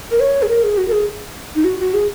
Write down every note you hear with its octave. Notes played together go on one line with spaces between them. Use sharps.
A#4
C#5
G#4
A#4
G#4
F#4
A#4
G#4
D#4
F#4
F#4
G#4